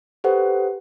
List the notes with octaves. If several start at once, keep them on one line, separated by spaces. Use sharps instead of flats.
G4 A4 B4 C5 F#5